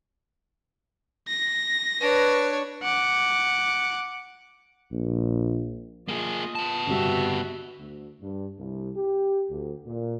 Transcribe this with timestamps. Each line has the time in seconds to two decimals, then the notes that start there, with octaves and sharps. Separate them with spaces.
1.28 A#6
2.01 D4 B4 C#5
2.83 F#5 D6
4.92 A#1
6.09 A#3 F4 G#4 D#5
6.55 B3 A5
6.87 G1 C3 G3 F#4 E5
7.78 D2
8.20 G2
8.58 C2
8.96 G4
9.49 D2
9.85 A#2